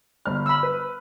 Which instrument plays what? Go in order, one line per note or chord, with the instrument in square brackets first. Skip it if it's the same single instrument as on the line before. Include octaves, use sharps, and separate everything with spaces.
[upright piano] G1 F6
[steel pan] B5 E6
[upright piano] B4